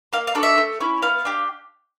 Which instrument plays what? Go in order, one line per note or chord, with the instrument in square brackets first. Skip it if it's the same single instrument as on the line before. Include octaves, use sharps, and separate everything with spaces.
[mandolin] A#3 F5
F5
D4 F#4 A4
E5
A3
C#4 E4
B3 F5
D4 G4